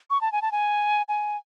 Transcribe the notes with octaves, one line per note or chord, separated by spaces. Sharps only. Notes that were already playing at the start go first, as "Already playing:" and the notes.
C#6
A5
G#5
A5
G#5
G#5